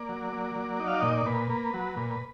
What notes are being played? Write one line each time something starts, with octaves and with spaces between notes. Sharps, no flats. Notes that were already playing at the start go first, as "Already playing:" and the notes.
Already playing: A#3 D5
F#3
A#3
F#3
D#4
F5
A#2 D#5
D5
A#2 B4
A#3
F#3
A#2